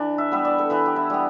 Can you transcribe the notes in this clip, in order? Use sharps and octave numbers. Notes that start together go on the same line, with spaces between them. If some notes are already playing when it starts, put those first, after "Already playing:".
Already playing: E3 D4
E5
G3 B3 E5
D5
A4
E3 B4
G4
E4
G3 B3